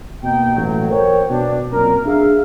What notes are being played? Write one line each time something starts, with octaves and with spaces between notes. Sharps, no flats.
B2 A#3 D#4 G5
A1 F#3
A#4 C5 C#5 G5
B2 D4
F#2 A#2 C4 C#4 A#4
D4 G#4 E5 F5